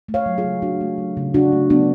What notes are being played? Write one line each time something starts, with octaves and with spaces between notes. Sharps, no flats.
A3
C#5 F5
F#3
F4 G#4
C#3
C#3 D4 F#4
A3
F#3
C#3
C#3 D4 F#4
A3
F#3 B3 D4